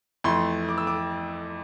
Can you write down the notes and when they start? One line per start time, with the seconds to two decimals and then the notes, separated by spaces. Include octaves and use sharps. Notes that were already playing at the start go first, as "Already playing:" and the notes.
0.24 F2 E3 A3 C6
0.69 D6
0.78 E6
0.87 D6